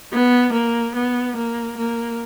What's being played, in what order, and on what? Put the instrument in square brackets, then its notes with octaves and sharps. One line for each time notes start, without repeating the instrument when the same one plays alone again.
[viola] B3
A#3
B3
A#3
A#3